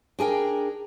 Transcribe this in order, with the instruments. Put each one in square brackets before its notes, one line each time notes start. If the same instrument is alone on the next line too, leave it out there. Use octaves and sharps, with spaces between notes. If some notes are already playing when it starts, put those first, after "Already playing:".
[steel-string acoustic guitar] D4 G#4 A#4 G5